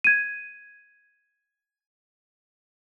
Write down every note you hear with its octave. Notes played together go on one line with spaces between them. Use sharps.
G#6 D#7